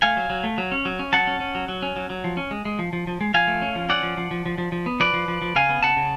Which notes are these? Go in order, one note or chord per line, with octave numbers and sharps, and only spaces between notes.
A3 F5 G#5
F#3
F#3
A3
F#3
C#4
F#3
C#4
F#3 F#5 A5
C#4
C#4
F#3
F#3
C#4
F#3
F#3
F3
C#4
G#3
G#3
F3
F3
F3
G#3
F3 F5 G#5
A3
C#4
F3
C#4 D5 F#5
F3
F3
F3
F3
F3
F3
B3
F3 B4 D5
F3
F3
F3
C#3 F5 G#5
B3
C#3 F#5 A5
C#3